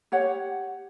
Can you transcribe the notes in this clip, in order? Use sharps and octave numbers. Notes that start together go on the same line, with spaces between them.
G4 C#5 F#5